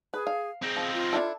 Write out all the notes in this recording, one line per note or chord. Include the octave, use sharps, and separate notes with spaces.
G#4 B4
F5
C4 D#4 G#4
F3
F4
D4 E4 A4